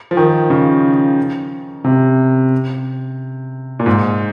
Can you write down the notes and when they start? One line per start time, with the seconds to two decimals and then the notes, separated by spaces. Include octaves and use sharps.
0.11 F3
0.17 D#3
0.50 C#3
1.84 C3
3.80 A#2
3.86 G#2